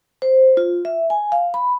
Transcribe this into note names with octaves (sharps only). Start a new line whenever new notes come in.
C5
F4
E5
G#5
F5
B5